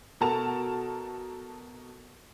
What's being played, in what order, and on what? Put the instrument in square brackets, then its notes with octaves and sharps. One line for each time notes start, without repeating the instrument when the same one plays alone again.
[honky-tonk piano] B2 F#4 A4 A#4 A5 F7